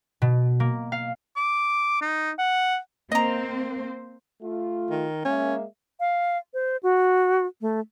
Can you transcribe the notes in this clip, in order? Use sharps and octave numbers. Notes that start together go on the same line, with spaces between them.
B2
A#3
F5
D6
D#4
F#5
A#3 C4 C5 D#5 A#5
A3 F4
D#3
G#3 A#3 C#4 E5
F5
C5
F#4
A3